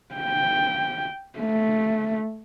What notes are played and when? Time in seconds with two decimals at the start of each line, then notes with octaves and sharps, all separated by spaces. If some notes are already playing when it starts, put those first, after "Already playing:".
0.15 G5
1.39 A3